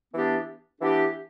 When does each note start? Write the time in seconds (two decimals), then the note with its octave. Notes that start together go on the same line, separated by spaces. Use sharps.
0.12 E3 B3 D4 G4
0.81 E3 B3 D4 G4